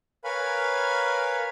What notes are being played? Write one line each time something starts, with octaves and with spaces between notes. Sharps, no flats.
A#4 B4 C#5 F5 G#5 B5